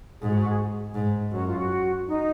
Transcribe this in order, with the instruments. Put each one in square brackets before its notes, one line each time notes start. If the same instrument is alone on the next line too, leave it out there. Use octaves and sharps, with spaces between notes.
[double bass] G#2 [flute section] G#4
[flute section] F#4
F#4
G#4
[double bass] G#2
[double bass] F#2 [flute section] F#4
[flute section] F4
F#4
D#4